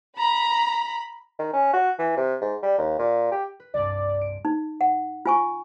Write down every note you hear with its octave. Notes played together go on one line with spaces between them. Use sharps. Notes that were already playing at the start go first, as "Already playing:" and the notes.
A#5 B5
D#3
C#4
F#4
E3
C3
G#2
G3
D#2
A#2
G4
B4
C2 G2 D5
D7
D#4
F#5
F4 G#5 C#6